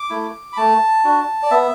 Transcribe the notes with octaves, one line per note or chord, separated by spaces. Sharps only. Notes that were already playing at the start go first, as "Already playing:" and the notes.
Already playing: D6
A3 E4
B5
A3 A5
D4 F#4
D5
B3 E5